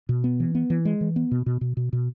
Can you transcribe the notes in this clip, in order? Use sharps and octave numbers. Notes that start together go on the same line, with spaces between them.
B2
B3
E3
B3
E3
G#3
E3
B3
B2
B2
B2
B2
B2